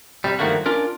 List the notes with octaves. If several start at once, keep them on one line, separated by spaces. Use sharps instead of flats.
C3 G3
G2 D#3 F3 A3 A#3 F#4
C#4 D4 F4 A#4